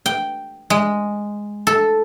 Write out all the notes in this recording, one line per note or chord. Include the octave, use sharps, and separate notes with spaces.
G5
G#3
A4